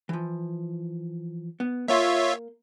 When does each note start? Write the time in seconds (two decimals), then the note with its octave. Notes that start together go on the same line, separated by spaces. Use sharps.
0.09 E3 F3
1.60 B3
1.88 A#3 F4 C#5 E5 C6